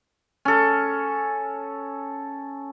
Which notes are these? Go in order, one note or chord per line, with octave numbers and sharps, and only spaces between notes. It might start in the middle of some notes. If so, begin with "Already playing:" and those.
C#4 A4